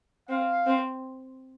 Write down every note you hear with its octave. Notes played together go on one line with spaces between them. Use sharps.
C4 F5
C4